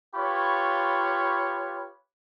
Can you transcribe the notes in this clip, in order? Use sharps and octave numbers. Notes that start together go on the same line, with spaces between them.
F4 G4 B4 C#5 B5 C#6